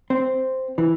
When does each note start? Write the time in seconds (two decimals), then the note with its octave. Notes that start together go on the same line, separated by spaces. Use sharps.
0.10 C4
0.78 E3